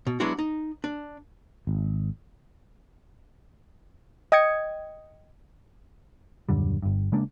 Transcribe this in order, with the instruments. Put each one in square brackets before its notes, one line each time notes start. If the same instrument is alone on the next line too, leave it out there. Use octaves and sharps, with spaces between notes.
[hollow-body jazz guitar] B2
F#3 G#3 B3 D4 E4 F#4
D#4
D4
[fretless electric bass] G#1
[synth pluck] D#5 G5 D#6 G#6 C#7
[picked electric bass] D#1 F#2 D3 G3
G1 G2
C#3 G#3 A#3 D4